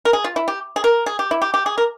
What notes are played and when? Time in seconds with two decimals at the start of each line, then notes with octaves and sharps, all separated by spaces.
0.05 A#4
0.13 G#4
0.24 F4
0.36 E4
0.48 G4
0.76 G#4
0.84 A#4
1.06 G#4
1.19 G4
1.31 E4
1.42 G4
1.54 G4
1.66 G#4
1.78 A#4